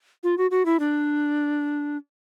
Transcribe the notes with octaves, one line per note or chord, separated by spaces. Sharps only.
F4
F#4
F#4
E4
D4